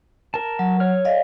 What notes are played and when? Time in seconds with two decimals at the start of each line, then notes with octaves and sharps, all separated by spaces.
0.34 A#4 A5
0.59 F#3
0.80 C#5 F6
1.05 D5 D#5 F5